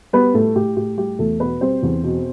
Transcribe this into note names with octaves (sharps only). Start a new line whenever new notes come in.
G3 B3 B4
A2 A3 A4
A2 G4
A2 G4
G3 G4
E2 A3 A4
B2 B3 B4
G3 C4 C5
E2
B2